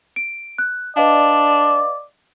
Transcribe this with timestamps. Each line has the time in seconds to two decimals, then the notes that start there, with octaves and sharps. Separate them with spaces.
0.16 D7
0.58 F#6
0.97 D4 B4 D5 D#5 F5